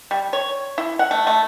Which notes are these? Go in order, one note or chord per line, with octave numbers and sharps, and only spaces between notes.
G3
C#5
E4
F#5
A3
A3